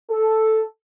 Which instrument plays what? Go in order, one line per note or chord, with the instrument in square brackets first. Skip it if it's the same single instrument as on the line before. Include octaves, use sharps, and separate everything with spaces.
[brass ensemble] A4